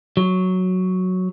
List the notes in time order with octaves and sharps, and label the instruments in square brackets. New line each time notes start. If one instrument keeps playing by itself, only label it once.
[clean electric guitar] F#3